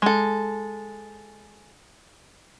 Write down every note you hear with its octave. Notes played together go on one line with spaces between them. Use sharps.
G#3 A4